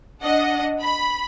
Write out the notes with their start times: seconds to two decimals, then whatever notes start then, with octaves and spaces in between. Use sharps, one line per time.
0.22 D4 D#5 F#5
0.80 B5